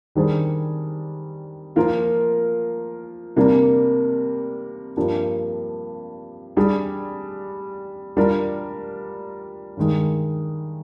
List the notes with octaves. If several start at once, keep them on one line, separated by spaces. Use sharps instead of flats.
D#3 G3 D4 G#4 C5
F3 A#3 F4 A#4
C3 G3 A#3 D4
G2 F3 A#3 D4 G4
G3 D4 G#4
G3 D4 F4 A#4
G2 D#3 G#3